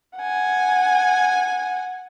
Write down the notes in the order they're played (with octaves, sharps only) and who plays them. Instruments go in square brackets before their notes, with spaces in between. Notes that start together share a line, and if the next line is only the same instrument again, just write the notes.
[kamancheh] F#5 G#5